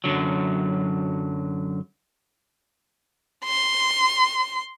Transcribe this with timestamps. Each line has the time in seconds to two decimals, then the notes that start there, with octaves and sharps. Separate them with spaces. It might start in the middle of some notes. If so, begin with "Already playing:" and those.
0.04 F#2 A#2 D3 F#3
3.46 C6